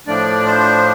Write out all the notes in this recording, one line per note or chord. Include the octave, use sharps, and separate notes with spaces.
A2 F3 A3 D4 D5
C5